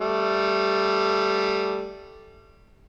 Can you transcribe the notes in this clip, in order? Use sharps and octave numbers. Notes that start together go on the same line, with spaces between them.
G3 A3